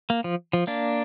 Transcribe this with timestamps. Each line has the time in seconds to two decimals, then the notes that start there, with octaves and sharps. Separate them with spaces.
0.10 A#3
0.24 F3
0.53 F3
0.67 A#3 D4